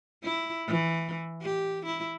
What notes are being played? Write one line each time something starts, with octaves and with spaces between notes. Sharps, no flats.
E4
E3
G4
E4